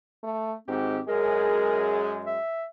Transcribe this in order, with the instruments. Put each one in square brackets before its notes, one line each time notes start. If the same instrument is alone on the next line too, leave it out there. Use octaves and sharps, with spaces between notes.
[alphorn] A3
[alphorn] G#2 [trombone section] D#3 F#4 G4 [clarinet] C4
[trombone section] F#2 G#3 [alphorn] G#4 [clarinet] A#4
[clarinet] E5